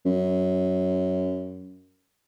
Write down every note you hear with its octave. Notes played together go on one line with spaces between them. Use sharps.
F#2